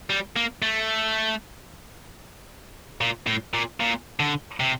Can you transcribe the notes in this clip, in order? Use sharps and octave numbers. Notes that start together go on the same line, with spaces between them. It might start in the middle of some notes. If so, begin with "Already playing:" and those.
G3
A#3
A3
A#2
A2
A#2
A#2
D3
C3